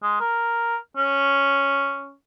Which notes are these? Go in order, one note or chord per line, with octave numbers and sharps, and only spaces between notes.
G#3
A#4
C#4